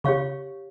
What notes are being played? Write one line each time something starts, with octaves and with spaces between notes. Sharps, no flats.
C#3 G4 C#5 F5 C#6